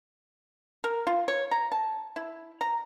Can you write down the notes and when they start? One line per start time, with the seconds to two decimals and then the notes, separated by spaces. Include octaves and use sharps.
0.84 A#4
1.07 F4
1.28 C#5
1.51 A#5
1.72 A5
2.16 E4
2.61 A#5